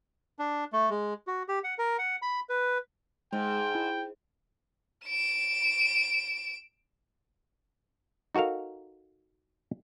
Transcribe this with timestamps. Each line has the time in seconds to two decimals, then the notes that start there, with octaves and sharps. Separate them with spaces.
0.39 D4
0.73 A3
0.90 G#3
1.27 F#4
1.48 G4
1.64 F#5
1.78 A#4
1.98 F#5
2.22 B5
2.49 B4
3.33 G#2 G#3 G5
3.75 E4
5.05 D7 E7
8.35 D#4 F#4 A4 A#4 F5